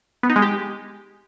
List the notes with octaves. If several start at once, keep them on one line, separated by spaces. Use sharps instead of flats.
B3
D#4
G#3
G4